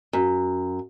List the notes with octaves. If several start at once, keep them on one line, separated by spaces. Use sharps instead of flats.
F#2